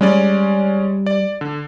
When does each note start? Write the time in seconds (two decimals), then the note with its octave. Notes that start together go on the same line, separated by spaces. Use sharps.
0.01 G3 G#3 C#4 D5
1.06 D5
1.41 D3